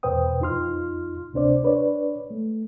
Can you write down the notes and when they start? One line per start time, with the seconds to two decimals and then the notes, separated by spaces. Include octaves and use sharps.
0.03 E2 B2 B4 C5 G5 D#6
0.40 F2 D#4 F4 C6 F6
1.33 D2 C3 D4 C5 D5
1.63 D4 B4 C#5 D5
2.30 A3